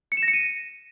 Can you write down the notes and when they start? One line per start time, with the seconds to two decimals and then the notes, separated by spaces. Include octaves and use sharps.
0.12 C#7
0.17 E7
0.23 A#6
0.28 C#7
0.33 D#7